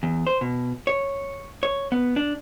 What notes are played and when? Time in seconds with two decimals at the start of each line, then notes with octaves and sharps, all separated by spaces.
0.03 E2
0.27 C5
0.41 B2
0.87 C#5
1.63 C#5
1.92 B3
2.16 D4